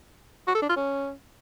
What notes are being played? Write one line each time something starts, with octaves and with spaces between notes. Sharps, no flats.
F#4
A4
D4
F4
C#4